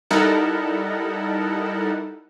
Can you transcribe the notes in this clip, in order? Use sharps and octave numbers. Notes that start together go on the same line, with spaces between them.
G3 D#4 E4 A4 A#4 F#5